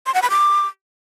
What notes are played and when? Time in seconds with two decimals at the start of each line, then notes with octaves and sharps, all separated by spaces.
0.06 C6
0.14 F#5
0.22 B5
0.30 D6